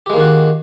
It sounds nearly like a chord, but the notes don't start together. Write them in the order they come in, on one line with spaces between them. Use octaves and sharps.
G4 G#3 A#3 D#3 F#4